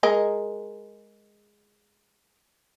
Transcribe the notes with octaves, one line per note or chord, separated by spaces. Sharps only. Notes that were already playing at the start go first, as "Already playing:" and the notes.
G#3 A#4 D#5